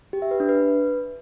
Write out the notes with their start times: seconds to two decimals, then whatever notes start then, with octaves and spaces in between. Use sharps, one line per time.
0.13 G4
0.22 E5
0.31 B4
0.40 D4
0.49 B4